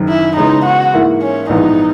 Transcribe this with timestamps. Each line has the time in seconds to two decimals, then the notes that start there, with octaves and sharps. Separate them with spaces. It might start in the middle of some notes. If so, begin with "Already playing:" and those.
Already playing: F#1 F#2 D#3
0.09 E4
0.37 C#3 E3 G#3 B3 D#4
0.66 F#4
0.93 G#2 E3 A#3 E4
1.22 C#4
1.49 A#1 G#2 E3 B3 D#4